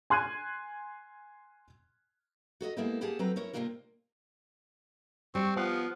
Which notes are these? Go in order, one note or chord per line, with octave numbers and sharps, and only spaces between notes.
G#5 C6 F#6 G#6 D#7
F#4 A4 D#5 A#5
G#3 A#3 B3 E4 G4 A4
A#3 G4 G#4 F#5 A5
F#3 C4 A4 B4 G5 A#5
C#4 E4 A#4 C#5
C3 F#3 G3 A#3 F4 A#4
G3 C4 C#6
F3 B3 F5